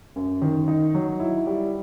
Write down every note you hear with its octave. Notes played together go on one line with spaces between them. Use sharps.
F#2
D#3
D#4
F#3
E4
G3